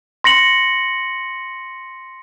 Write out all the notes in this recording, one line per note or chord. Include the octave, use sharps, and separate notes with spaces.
C6 A#6 C#7 F#7